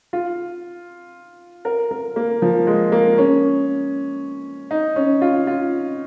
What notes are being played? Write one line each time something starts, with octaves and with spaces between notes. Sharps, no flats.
F4
A#4
A#4
A#3
F3
G#3
A#3
C#4
D#4
C#4
F4
F4